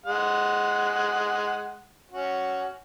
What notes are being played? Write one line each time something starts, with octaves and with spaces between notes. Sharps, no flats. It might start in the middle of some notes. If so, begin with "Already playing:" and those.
G#3 F#5
C#4 F#4